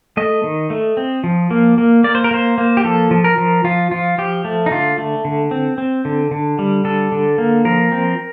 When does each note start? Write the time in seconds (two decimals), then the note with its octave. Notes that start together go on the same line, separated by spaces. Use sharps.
0.17 A3 D#5
0.44 D#3
0.70 A3
0.97 C4
1.24 F3
1.51 A#3
1.78 A#3
2.04 A#3 D5
2.15 C5
2.24 A#4
2.31 A#3 C5
2.58 A#3
2.77 G4
2.85 F3 A4
3.11 F3
3.24 A#4
3.38 F3
3.64 F3 F4
3.91 F3 F4
4.18 F3 G4
4.45 A3
4.66 D#4
4.71 D3 F4
4.98 A3
5.25 D3
5.51 C4
5.78 C4
6.05 D3
6.31 D3
6.59 G3
6.85 D3 A4
7.12 D3
7.38 A#3
7.65 F3 A#4
7.92 C4